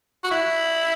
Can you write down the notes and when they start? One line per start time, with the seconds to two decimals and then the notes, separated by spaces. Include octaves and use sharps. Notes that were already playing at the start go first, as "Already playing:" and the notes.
0.24 F#4
0.31 E4